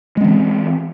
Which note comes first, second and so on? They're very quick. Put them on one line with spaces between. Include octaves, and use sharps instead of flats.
G#3 C#4 E3 C4